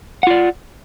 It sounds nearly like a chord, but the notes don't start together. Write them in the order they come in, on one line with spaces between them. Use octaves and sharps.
F#5 F4 D5